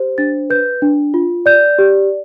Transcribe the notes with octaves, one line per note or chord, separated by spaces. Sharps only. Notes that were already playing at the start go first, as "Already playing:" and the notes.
Already playing: G4 C5
D4 A6
B4 G6
D4
F4
D5 G6
G4